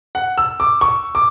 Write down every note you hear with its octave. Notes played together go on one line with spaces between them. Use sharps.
F#5
E6
D6
C#6
D6